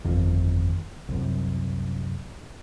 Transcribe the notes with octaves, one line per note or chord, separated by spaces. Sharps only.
G1 F2 D#3
C2 F#2